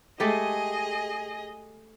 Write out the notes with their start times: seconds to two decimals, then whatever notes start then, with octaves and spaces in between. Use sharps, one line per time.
0.20 G#3 A3 G4 G#4 D#5